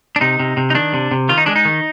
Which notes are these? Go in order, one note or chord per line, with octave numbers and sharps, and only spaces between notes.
D4
C3 D#4
C3
C3
D#4
D#3 D4
C3
C3
D#3 F4
D#4
G#3 D4
D#4
D#3